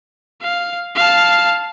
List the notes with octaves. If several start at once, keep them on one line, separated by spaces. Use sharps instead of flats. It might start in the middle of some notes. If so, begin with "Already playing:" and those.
F5
F5 A5